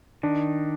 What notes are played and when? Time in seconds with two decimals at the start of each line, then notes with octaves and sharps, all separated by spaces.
0.23 D#3 D4